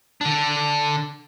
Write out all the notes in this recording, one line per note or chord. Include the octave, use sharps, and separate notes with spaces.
D3 D4